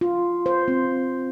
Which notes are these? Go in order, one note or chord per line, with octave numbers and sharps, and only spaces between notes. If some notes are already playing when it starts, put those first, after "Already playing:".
F4
C5
C4